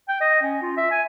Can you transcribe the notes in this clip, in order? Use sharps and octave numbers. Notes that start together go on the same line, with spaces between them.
G5
D#5
C#4
F4
E5
G#5